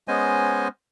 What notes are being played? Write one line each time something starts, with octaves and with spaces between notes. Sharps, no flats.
G#3 B3 C#4 C5 D#5 G#5